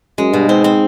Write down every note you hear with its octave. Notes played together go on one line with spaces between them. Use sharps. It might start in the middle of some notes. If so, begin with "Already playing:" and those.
F#2 G#3
G2 B2
G#2 C4
C4